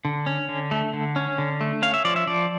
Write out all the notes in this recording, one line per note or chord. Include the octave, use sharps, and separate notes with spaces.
D3
C#4
D3
A3
D3
C#4
D3
A3
C#4 F5
E5
F3 D5
E5
F3 D5